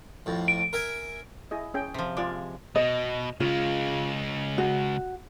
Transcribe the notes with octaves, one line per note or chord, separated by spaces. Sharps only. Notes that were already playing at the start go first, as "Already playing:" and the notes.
F2 A2
D7
A#4 E5 G#5
E4 G#4 D#5
C#4 G#4 G5
C3 F3
G#3 F4 D5 D6
B2 D#5
C#3 G#3 F4
F#4